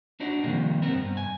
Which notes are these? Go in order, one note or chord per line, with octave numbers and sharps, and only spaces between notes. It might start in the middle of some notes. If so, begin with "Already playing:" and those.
D4 D#4 F#4 C5 D5
C3 D#3 F3 G3 G#3 A#3
B3 C4 A#4
G2
G#5